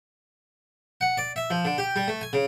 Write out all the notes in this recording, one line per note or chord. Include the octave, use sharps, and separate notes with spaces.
F#5
D5
E5
F3
D3
G4
G3
A3
G#5
C#3